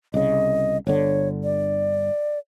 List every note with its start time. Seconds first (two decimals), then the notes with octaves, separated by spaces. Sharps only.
0.14 C2 C#3 D#5
0.87 G1 D3 C#5
1.44 D5